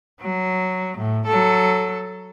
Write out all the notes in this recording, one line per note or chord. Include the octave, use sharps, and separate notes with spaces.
F#3
A2
F#3 A4